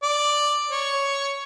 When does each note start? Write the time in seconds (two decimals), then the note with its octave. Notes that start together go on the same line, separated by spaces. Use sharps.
0.03 D5
0.71 C#5